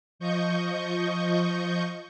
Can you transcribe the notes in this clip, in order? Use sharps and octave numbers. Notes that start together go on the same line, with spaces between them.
F3 D#5 C#6 G6